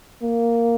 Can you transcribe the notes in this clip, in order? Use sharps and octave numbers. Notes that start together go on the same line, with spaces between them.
A#3